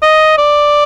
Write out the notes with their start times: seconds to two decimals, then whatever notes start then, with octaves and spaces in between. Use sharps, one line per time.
0.02 D#5
0.38 D5